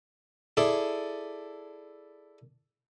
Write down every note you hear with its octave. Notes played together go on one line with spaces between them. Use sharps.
E4 G#4 A4 D5 A5